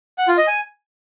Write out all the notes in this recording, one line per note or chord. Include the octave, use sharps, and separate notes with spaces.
F#5
F4
D#5
G#5